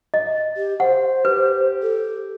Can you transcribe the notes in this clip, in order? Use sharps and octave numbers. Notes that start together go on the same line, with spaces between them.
D#5
G4
C5 F#5
G4 B4
A4